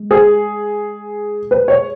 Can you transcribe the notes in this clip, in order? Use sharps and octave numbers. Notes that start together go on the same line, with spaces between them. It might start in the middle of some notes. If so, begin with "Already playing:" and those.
Already playing: G#3
G#4
B4
C#5